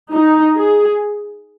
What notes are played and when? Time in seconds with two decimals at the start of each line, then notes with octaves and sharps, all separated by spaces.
0.14 D#4
0.58 G#4